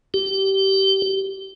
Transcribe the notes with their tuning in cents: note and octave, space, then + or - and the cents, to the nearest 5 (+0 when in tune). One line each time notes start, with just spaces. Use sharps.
G4 -20